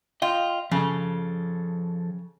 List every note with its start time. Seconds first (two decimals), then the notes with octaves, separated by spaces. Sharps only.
0.22 F4 D#5 G5
0.71 C#3 F3 A4